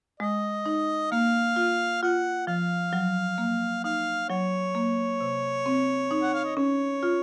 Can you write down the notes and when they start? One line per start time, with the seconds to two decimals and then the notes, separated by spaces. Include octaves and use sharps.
0.20 G#3 D#5
0.66 D#4
1.11 A#3 F5
1.56 F4
2.03 F4 F#5
2.47 F3 F5
2.93 F#3
3.38 A#3
3.84 D#4 F5
4.29 F#3 C#5
4.75 A#3
5.20 C3
5.66 C4
6.11 D#4
6.23 F#5
6.34 F5
6.45 D#5
6.56 C#4 C#5
7.03 F4